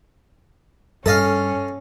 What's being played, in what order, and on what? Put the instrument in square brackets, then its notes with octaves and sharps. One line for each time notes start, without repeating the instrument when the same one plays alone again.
[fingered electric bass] G2 [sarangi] C#4 [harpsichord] A4 D#5 F5